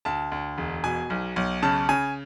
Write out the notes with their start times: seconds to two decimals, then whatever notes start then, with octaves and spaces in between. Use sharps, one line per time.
0.05 D2 A5
0.32 D2
0.58 E1
0.84 B2 G#5
1.10 B1
1.36 B1
1.63 C#3 A5
1.89 C#3 G#5